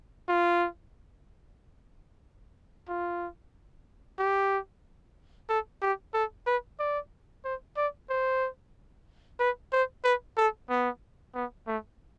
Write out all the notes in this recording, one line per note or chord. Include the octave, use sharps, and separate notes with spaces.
F4
F4
G4
A4
G4
A4
B4
D5
C5
D5
C5
B4
C5
B4
A4
B3
B3
A3